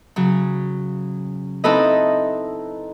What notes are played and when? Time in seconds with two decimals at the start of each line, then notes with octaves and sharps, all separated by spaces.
0.16 C#3 F#3
1.64 C4 D#4 E4 A4 B4 D#5